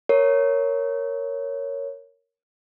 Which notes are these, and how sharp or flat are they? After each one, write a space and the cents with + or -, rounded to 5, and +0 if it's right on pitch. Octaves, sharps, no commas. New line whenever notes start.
A#4 -5 C#5 +0